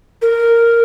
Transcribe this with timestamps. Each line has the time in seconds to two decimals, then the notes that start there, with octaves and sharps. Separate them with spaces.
0.22 A#4